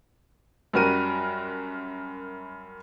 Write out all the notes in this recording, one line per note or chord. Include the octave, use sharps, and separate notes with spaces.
F#2 G3 F#4 A#4 D#7